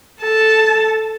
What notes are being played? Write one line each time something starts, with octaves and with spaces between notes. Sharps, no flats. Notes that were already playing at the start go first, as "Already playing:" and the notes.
A4 A5